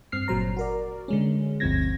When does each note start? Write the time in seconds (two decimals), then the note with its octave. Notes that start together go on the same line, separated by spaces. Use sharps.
0.12 G2 C4 F6 C7
0.28 G1 A#2 F#3 C5 A#5
0.57 F#4 A#4 D5
1.08 D3 G#3 C#4
1.60 G1 D2 F3 C4 G#6 A#6